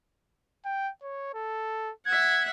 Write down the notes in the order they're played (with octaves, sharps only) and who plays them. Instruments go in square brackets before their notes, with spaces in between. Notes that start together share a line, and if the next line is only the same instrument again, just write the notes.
[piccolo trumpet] G5
C#5
A4
[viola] E5 F#5 [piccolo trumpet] G#6